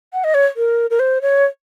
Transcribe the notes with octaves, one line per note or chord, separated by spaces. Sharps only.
F#5
D#5
C#5
A#4
A#4
C5
C#5